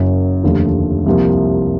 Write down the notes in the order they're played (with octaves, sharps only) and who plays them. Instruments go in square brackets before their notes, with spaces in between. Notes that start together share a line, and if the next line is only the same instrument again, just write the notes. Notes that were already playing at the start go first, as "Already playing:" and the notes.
Already playing: [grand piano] F#1 F#2 C#3
F1 D#2 D3 F3 A3
C2 C3 F3 A#3